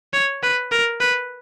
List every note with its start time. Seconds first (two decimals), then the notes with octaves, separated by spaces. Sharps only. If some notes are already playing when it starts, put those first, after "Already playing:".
0.13 C#5
0.43 B4
0.72 A#4
1.01 B4